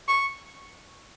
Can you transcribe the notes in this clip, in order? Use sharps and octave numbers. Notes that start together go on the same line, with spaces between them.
C#6